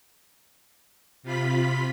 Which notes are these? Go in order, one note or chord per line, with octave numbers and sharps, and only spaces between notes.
C3 F4 B5 B6